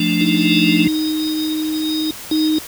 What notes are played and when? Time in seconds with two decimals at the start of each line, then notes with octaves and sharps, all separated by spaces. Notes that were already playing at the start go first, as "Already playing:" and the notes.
Already playing: F3 A3 D4
0.21 D#4
2.31 D#4